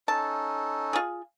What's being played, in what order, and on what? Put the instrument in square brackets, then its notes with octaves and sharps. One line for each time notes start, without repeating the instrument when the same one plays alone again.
[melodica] C#4 D#4 A4 [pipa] A5
[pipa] F4 G#4